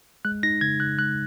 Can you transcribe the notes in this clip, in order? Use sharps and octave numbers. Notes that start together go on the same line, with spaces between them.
G#3 F#6
D#4 A#6
C#3 G#6
C#3 F#6
G#3 F#6